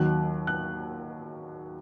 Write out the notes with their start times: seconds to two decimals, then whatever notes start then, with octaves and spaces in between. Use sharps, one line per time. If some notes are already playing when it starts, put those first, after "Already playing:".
Already playing: D#2 D#3 F#3 F#6
0.47 F#6